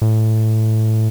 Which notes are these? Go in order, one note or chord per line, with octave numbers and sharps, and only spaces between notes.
A2